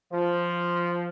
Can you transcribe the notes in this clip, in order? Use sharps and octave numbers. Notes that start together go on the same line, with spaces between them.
F3